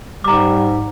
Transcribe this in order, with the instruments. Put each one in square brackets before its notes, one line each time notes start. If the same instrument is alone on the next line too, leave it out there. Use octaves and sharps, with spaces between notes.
[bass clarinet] G#2 [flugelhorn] G3 [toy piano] A#5 D6